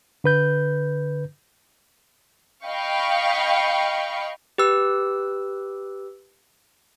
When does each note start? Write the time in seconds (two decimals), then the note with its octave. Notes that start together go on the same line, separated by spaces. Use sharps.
0.24 D3 B4 G6
2.66 D#5 F5 G5 B5 C#6
4.58 G4 B4 E6